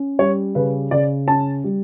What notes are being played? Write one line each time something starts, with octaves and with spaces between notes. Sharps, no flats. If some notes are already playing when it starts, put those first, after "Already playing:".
Already playing: C#4
G3 C#5
C#3 B4
C#3 D5
C#4 A5
G3